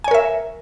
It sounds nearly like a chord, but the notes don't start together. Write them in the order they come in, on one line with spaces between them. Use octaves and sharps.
G#5 C#5 A#4 E5